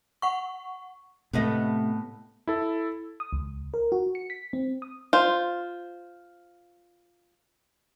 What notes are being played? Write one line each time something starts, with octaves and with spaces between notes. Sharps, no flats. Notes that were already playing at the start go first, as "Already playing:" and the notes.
F#5 C#6
A2 C3 A3 B3 D#5
E4 A4
D#6
C#2
A#4
F#4
C#7
B6
C4
D#6
F4 C5